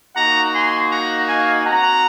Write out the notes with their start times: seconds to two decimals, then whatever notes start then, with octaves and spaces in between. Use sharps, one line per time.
0.15 A#3 D#4 F#4 F#5 A#5
0.53 G#5 C6
0.90 F#5 A#5
1.28 F5 G#5
1.65 C4 F#4 F#5 A#5